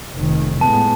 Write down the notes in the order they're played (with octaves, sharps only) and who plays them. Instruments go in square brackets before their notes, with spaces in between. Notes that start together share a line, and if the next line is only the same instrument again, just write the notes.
[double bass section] F1 D#3
[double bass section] A2 G#3 B3 [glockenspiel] A5